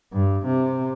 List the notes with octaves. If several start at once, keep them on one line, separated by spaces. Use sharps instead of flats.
G2
C3